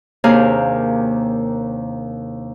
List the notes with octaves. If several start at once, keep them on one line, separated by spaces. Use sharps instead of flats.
D#2 C3 A#3 D4 G#4 F5